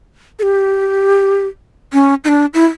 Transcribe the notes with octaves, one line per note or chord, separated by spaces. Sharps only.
A4
G4
C#4
D#4
D4
E4